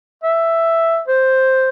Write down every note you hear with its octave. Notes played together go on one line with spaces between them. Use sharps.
E5
C5